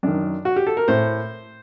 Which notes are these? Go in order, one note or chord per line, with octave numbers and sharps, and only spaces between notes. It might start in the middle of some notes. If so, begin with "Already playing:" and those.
F#2 D#3 D4
F#4
G4
A4
A#4
A2 C5